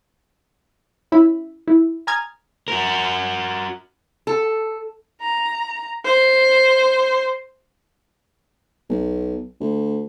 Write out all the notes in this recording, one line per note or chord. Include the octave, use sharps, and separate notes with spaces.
C#4 E4 B5
E4
G#5 A#5 D#6 F6 G#6 A6
F#4 A#4
A4
A#5
C5
B1
D2